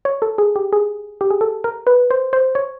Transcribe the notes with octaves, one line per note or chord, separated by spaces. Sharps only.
C#5
A4
G#4
G4
G#4
G4
G#4
A4
A#4
B4
C5
C5
C#5